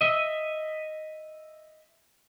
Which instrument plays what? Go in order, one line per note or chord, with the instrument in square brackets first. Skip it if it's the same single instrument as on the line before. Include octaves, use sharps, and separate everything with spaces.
[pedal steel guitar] D#5 E5